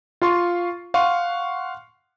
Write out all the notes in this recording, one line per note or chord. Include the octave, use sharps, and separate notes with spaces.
F4 F5 C6 C#6
F5 F#5 C6 C#6